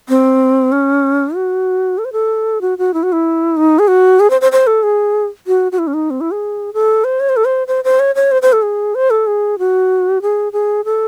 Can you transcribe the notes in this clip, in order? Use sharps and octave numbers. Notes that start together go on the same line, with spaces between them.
C4
C#4
F#4
A4
C5
A4
F#4
F#4
E4
F#4
E4
D#4
G#4
F#4
G#4
C5
C5
C5
A4
G#4
F#4
F#4
E4
C#4
D#4
C4
E4
G#4
A4
C5
C#5
C5
A4
C5
C5
C5
C#5
C#5
C5
C5
A4
G#4
C5
A4
G#4
F#4
G#4
G#4
A4